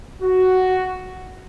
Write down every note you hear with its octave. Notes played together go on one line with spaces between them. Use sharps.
F#4